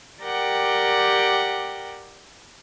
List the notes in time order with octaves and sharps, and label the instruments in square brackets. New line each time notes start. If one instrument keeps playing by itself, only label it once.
[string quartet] G4 A#4 D5 F#5 G5